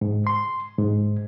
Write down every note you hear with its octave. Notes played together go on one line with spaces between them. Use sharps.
G#2
C6
G#2